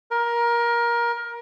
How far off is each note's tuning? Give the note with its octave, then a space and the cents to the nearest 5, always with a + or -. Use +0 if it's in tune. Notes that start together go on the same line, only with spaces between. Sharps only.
A#4 +20